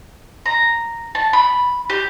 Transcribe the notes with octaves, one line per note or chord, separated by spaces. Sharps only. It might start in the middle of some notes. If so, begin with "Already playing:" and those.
A#5
A5
B5
G4